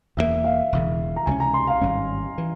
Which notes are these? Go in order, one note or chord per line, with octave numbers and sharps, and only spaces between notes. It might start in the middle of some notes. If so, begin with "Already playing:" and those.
E1 E2 E3 A#3 E5
F5
E1 E2 C#3
A#5
C#2 C3 G3 G#5
C#4
A#5
C6
F5
G#1 G2 G3 C#4
E3